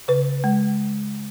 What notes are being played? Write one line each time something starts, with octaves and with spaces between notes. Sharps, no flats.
C#3 B4
G#3